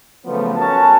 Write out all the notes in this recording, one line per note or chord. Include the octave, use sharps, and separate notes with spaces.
C#3 F3 F#3 A3 B3
C#4 F#4 A#4 C#5 A5